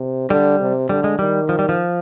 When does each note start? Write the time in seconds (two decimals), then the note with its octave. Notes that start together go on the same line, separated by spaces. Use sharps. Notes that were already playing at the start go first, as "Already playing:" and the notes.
Already playing: C3
0.29 D3 G3
0.60 C3
0.89 D3 G3
1.04 G#3
1.19 D#3 G3
1.49 F3
1.59 G3
1.69 F3